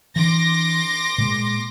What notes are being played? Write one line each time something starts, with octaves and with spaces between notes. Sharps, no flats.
E3 D4 C6 D6 A#6
A#2 G#3